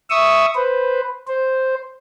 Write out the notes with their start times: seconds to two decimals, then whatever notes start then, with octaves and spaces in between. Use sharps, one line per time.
0.10 E5 C#6 D#6 E6
0.55 B4 C5
1.28 C5